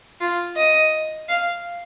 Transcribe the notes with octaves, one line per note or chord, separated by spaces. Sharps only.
F4
D#5
F5